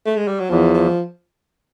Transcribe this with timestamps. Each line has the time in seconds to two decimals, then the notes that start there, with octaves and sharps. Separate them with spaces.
0.06 A3
0.17 G#3
0.28 G3
0.40 F#3
0.50 E2 F3
0.74 F3